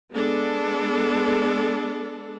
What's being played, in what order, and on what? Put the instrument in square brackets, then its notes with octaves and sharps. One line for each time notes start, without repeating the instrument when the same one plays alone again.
[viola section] G#3 B3 D4 A4